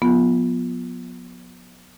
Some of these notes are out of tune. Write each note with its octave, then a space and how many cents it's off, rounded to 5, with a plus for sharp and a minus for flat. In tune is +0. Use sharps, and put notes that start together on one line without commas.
F3 +45 B3 -15 F4 +0